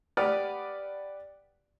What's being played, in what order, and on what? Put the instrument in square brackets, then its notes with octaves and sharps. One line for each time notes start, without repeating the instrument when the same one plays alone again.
[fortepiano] G4 B4 D5 F#5 D#6 F6